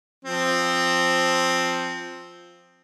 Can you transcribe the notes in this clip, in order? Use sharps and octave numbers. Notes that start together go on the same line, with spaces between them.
F3 C4